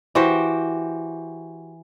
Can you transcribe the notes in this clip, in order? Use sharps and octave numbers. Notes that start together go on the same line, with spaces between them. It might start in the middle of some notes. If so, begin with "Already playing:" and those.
E3 F#4 G4 C5